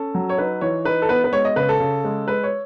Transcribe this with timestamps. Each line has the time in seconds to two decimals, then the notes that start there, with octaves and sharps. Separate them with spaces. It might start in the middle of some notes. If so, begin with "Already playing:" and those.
Already playing: C#4 A4
0.15 F#3
0.29 C#5
0.38 D#4 B4
0.61 E3 C#5
0.85 D#4 B4
1.02 A4
1.09 B3 B4
1.24 B4
1.32 G#3 C#5
1.45 D#5
1.56 C#3 B4
1.69 A4
1.80 C#3
2.04 G#3
2.28 G#3 B4
2.43 C#5